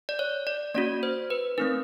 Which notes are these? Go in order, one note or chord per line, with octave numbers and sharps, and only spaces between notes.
D5
C#5
D5
A#3 C#4 F#4 D5
C5
B4
A3 C4 D#4 A#4